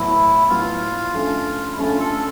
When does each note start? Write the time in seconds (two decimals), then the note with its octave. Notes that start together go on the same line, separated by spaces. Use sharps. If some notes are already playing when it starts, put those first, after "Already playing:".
Already playing: A2 F#3 B3 E4
0.49 A2 F#3 B3 F4
1.14 D3 F3 A3 C#4
1.73 E4
1.79 D3 F3 A3 C#4 F4
2.00 A4